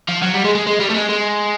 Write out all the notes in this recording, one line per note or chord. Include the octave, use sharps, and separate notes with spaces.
F3
F#3
G3
G#3
G#3
G#3
G3
A3
G#3
G#3